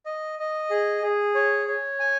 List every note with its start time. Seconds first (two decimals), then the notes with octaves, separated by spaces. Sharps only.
0.06 D#5
0.39 D#5
0.70 G#4
1.03 G#4
1.35 C#5
1.68 C#5
2.00 G#5